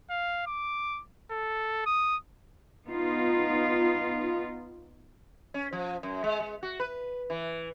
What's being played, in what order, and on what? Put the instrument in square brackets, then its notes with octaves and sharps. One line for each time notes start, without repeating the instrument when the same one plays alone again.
[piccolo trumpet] F5
D6
A4
D#6
[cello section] B3 D#4 F4
[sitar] C#4
F3
F#2
G#3
G#3
F#4
B4
E3